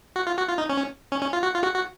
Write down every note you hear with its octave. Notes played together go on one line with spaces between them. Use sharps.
F#4
F4
F#4
F4
D#4
C#4
C#4
C#4
F4
F#4
F4
F#4
F#4